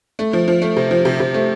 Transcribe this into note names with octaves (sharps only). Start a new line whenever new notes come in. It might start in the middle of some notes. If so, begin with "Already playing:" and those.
A3
F3
F3
A3
C3
F3
C3
C3
A3